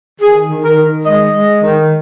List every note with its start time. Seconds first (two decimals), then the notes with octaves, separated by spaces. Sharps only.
0.20 D#3 G#4
0.49 D#3
0.63 A#4
0.77 D#3
1.05 G#3 D#5
1.34 G#3
1.63 D#3